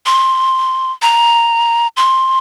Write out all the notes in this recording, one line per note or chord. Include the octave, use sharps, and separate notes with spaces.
C6
A#5
C6